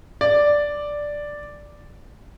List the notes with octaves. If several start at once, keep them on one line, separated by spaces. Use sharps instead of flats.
D5